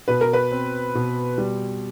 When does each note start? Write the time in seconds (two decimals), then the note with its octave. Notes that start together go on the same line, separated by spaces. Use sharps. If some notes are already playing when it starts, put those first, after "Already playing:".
0.08 B2 B4
0.21 A#4
0.33 B4
0.52 C4
0.95 B2
1.38 G3